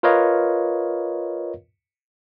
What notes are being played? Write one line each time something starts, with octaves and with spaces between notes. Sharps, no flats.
F4 A#4 B4 C#5 D#5 F5